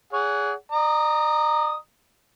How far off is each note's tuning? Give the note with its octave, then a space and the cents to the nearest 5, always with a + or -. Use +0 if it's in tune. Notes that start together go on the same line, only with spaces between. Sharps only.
G#4 +0 C#5 +45 F#5 +0
D5 +45 A#5 -5 D#6 +0